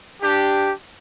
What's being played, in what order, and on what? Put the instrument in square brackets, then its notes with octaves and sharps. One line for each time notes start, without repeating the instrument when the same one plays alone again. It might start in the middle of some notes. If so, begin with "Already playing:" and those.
[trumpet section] D4 G4